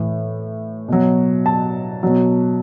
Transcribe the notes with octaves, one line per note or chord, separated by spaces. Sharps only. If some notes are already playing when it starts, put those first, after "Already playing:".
Already playing: A2 E3
B2 F#3
A5
B2 F#3